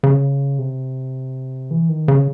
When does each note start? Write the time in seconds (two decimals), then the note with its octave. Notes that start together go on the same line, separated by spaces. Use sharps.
0.03 C#3
0.59 C3
1.71 E3
1.89 D#3
2.08 C#3